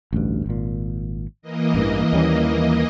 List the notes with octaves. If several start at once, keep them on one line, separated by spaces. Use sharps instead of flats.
A1 D2 G2
G#1 A#2
E3 A#3 D#5
A1 G2
D#2 G3 C#4